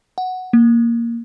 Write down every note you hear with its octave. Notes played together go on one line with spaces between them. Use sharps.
F#5
A#3